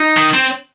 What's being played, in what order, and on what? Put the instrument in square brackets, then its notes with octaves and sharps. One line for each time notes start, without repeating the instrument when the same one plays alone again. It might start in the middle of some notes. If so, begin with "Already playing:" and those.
Already playing: [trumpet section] D#4
[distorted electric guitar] D#3
C4